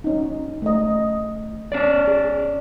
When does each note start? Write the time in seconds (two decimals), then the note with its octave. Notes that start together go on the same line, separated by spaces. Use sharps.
0.04 C#4 D#4
0.62 A3 D#5
1.72 C#4 D5
2.07 G#4